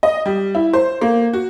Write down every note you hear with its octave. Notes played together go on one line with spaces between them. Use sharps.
D#5
G3
E4
C5
A#3
F#4